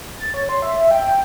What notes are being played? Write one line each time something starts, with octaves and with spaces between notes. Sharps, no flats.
A6
C#5
C6
E5
E5
G5